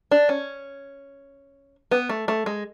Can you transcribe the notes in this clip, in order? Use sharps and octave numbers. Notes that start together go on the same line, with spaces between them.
D4
C#4
B3
A3
A3
G#3